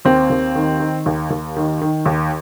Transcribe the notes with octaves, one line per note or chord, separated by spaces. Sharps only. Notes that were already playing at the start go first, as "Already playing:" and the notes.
D#2 C4
D#2
D#3
D#3
D#2
D#2
D#3
D#3
D#2